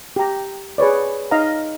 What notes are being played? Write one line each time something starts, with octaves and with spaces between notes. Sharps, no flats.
G4 A#5
G#4 B4 C#5 D5
D#4 D#5 F5 A#5